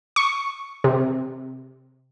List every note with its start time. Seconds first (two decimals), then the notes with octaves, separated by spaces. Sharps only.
0.16 C#6
0.84 C3